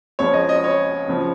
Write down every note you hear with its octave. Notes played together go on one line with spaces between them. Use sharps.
C#2 C#3 F3 C#5
D#5
D#5
C#5
C#2 C#3 F3